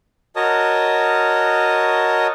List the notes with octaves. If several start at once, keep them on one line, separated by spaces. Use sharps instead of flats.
F#4 A#4 C#5 D#5 A5 D#6